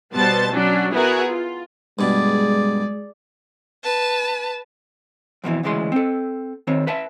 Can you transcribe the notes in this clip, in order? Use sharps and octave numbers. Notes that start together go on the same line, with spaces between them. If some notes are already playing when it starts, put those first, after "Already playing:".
B2 G3 B3 C5 A5 A6
F#3 C#4 D4
B3 E4 F#4 G#4 A#4 F#5
F4
G2 B2 G#3 G#4 D5
B4 A5
F2 B2 D3 E3
D2 C#3 E3 G#3 C6
C4 A4
D#3 C4 C#5
B4 E5 A5